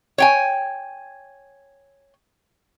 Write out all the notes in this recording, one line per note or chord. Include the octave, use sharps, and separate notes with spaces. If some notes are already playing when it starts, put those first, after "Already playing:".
C#5 G5 G#5